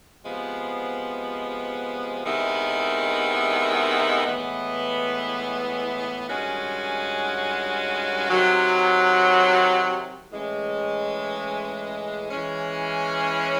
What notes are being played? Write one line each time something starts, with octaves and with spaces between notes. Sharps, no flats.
C3 F3 G#3 B3
C3 D#3 G#3 B3 E4
A2 E3 G#3 B3
G2 D#3 G#3 C#4 F#4
C3 D#3 F#3
A2 E3 G#3 C#4
E3 G#3 C#4